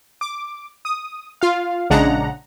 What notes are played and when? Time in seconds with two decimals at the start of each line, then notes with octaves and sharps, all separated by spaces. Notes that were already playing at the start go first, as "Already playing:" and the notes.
0.21 D6
0.85 D#6
1.41 F4 F5
1.90 A#1 C#3 G#3 D4 F#5 A#5